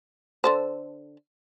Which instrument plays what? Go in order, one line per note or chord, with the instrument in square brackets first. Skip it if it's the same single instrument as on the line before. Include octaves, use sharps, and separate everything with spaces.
[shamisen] D3 A4 C5